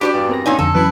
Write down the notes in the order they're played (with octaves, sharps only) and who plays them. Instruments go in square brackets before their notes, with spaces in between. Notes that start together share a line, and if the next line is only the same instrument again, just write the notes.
[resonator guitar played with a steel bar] D4 C#5 D5 [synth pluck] F#4 B5 [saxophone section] G4
[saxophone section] E2 G2 [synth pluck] G5 D6
[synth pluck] C4 A#4 A#6
[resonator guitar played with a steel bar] A#2 C#4 D#4 [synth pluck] D5
[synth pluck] F2 D3 [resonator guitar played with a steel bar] A4
[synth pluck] E3 F#3 C#4 [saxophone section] E4 B4